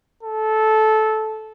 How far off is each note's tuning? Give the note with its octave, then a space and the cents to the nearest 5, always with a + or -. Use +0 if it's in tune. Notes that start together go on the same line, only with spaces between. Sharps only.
A4 -15